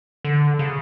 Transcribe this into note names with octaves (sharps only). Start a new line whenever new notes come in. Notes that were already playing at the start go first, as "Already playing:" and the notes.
D3
C#3